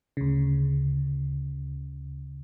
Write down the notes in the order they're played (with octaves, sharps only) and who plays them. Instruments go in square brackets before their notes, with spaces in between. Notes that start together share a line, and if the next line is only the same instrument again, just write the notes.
[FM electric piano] D2 C#3